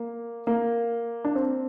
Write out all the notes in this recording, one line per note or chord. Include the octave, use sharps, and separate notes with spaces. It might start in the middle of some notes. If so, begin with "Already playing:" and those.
Already playing: A#3
A#3
D4
C4